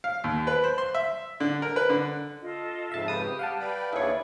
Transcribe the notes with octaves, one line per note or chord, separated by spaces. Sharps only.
F5
D#2
B4
C5
C6
E5
D3
A#4
B4
D3
F4 A4 D#5
F2 G#2 C#3 E5 A5
G4 B4 D#6
G3 F5 F#5 A5
B4 D5 G5 B5
D#2 D3 E4 G#4 C#5